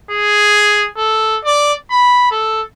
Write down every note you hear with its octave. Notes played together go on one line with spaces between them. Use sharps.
G#4
A4
D5
B5
A4